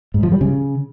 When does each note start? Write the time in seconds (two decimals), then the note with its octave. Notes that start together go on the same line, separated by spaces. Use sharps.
0.14 G#2
0.23 F3
0.32 G3
0.41 C#3